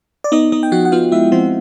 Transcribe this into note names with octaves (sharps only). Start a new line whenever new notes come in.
D5
B3 D#4 D#5
B3 D#4 D#5
G5
F3 F#4 F#5
F#5
B3 F4 F5
G#3 E4 E5
F3 C4 C5